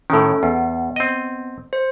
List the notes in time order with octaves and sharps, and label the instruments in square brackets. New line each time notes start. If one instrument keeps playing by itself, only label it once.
[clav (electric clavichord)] A2 D#3 [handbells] C#4 A4
[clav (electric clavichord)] E2 [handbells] B3
[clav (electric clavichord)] C4 D#5
[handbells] C5